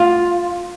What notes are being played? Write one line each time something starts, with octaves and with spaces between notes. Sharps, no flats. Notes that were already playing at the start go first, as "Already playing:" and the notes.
Already playing: F4